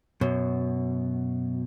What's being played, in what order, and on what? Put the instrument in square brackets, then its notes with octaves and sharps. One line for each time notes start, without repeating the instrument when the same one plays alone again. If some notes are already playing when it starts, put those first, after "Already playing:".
[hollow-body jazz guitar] F#2 [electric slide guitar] B2